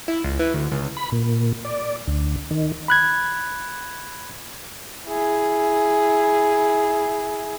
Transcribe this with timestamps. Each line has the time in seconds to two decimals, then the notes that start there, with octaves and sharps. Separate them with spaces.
0.08 E4
0.24 C#2
0.39 E3
0.54 D2
0.72 C#2
0.97 B5
1.12 A#2
1.65 D5
2.07 D2
2.51 D#3
2.88 B5 F#6 G#6
5.07 E4 G#4